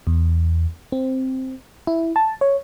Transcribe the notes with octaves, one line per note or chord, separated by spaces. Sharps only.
E2
C4
E4
A5
C#5